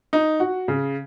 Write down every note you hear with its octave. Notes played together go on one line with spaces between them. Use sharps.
D#4
F#4
C#3